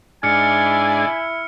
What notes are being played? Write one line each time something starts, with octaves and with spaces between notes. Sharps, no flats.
G#2 D4 E4 G#5 F6 C#7